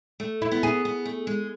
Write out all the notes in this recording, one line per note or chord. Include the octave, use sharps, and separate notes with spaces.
A3
E4
B3
G#4
B3
A3
G#3